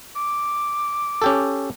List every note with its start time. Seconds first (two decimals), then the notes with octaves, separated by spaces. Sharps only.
0.16 D6
1.22 C#4 G4 A4